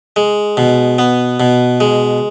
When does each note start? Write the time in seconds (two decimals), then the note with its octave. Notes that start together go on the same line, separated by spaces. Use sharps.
0.16 G#3
0.57 B2
0.99 B3
1.40 B2
1.80 G#3